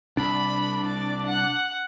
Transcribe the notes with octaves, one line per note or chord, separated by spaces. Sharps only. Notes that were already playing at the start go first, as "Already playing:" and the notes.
C2 D4 B5
D5
F#5